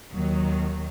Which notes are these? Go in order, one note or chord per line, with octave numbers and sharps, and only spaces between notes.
D#2 D#3 F#3